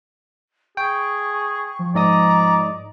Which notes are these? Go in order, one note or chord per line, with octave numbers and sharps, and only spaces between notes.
G#4 G5 C#6
F3
G#2 D5 D#5 A#5 D#6